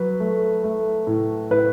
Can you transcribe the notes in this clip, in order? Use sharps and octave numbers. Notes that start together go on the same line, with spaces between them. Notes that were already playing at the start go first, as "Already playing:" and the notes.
Already playing: F#3 B4
A3
A3
A2
A2 B4